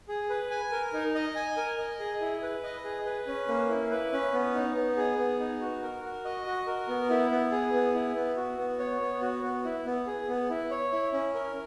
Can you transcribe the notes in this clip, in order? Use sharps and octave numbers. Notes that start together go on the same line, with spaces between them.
G#4
B4
G#5
A#4
D#4
D#5
G#5
A#4
D#5
G#4
E4
B4
D#5
G#4
B4
C#4
A#3
E4
B4
C#4
B3
D#4
B3
G#4
B3
D#4
F#4
A#4
F#4
D#5
F#4
A#4
B3
E4
B3
G#4
B3
E4
B3
F#4
B3
C#5
B3
F#4
B3
E4
B3
G#4
B3
E4
C#5
E4
C#4
A#4